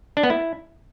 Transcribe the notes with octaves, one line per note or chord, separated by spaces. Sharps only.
D4
B3
E4